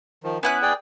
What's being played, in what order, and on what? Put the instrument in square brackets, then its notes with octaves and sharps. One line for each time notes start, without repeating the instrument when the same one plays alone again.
[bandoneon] D#3 F3
[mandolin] B3 E4 F#6 [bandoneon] C#4
[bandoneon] G#4 D5 G5